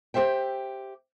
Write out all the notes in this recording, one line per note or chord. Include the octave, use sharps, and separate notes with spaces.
G4 A4 C5 E5 G5